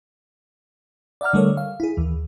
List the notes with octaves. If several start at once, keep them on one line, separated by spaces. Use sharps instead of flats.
D5 E5 F#5 A#5 F6
D3 G3 A3 A4 A#4 C#5
F5
E4 G#4
D#2 E3